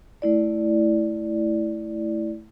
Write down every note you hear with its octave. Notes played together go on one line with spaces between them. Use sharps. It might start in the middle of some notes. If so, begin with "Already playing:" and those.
A3 E4 D5